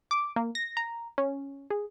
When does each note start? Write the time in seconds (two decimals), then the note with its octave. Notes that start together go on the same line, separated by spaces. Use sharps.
0.11 D6
0.36 A#3
0.55 A#6
0.77 A#5
1.18 C#4
1.70 G#4